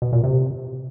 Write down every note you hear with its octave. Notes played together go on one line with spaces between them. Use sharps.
B2
A#2
C3